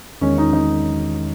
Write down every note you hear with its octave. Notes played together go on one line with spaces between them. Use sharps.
E2 D#3 G#3 C#4
D#4
D#4